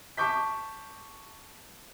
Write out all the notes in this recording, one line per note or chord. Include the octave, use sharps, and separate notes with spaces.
A5 C#6 D6 G6 B6